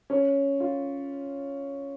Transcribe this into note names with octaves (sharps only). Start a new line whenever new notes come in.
C#4
F4